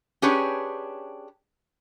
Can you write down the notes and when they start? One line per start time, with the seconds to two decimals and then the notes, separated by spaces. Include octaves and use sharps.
0.22 C#4 D4 G4 G#4 B4 C#5